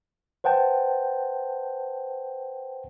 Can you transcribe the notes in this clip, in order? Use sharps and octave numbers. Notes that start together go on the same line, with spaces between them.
B4 C5 F#5 G5 A5